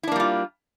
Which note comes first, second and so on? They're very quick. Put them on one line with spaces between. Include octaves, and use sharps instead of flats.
E4 D4 A#3 G3 F4